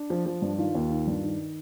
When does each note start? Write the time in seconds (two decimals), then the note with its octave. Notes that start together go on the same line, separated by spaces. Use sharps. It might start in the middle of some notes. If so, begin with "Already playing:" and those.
Already playing: D4
0.10 F3
0.26 F3
0.42 G2
0.58 D#3 F4
0.75 D#2
0.90 D#3
1.07 G2
1.23 D#3